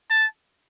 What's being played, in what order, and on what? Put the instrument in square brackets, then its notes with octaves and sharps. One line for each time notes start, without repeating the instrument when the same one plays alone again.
[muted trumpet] A5